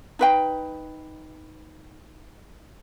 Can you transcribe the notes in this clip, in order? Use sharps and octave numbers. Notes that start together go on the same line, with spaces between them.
D#4 B4 G5